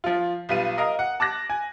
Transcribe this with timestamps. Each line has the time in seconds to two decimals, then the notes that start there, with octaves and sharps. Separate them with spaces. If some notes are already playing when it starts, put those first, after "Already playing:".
0.04 F3 F4
0.49 B1 G3 F4 B4 D#7
0.78 A#4 D#5 F5 A#5
0.99 F#5
1.20 A5 D6 F#6 A#6
1.50 G#5